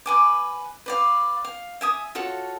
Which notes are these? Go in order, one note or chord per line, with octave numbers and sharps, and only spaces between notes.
B4 G#5 D6
B4 D5 F5
F5
E5 G#5 D#6
F4 F#4 A4 C#5